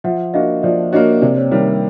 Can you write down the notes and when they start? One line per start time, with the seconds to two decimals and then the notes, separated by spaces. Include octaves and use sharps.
0.04 F3 E5 F#5
0.34 A#3 D4 F#4 D#5 F5
0.63 F3 D5 E5
0.92 A#3 D4 F#4 C#5 D#5
1.22 C3 C5 D5
1.37 C#5
1.51 D#3 G3 A#3 C#5
1.66 C#5